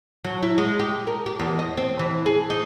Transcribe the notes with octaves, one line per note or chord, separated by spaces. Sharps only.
F#3
E4
G#3
G4
A#4
G4
E2
D#5
C4
E3
G#4
D#4